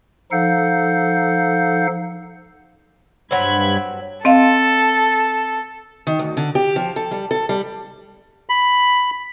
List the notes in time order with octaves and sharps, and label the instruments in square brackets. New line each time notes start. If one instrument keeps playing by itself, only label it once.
[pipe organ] F3 D#4 A4 F5 F#5 G6
[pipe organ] G2 B5 G#6 [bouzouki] F#3 C4
[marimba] C4 D#5 F5 [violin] A4
[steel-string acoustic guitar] D#3
D2
D3
G4
F3
A4
G3
A4
G3
[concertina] B5